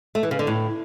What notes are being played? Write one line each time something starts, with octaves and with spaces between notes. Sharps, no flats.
A3
E3
C#3
D3
A2